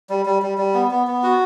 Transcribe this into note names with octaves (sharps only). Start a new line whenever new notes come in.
G3
G3
G3
G3
B3
B3
B3
F#4